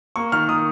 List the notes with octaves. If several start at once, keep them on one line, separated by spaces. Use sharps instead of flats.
A#3 C#6
D#3 F6
D#3 D#6